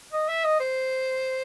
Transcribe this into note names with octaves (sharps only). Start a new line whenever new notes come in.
D#5
E5
D#5
C5